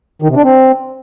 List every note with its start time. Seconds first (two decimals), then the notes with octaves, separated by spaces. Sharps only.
0.22 D#3
0.29 C3
0.37 D4
0.44 C4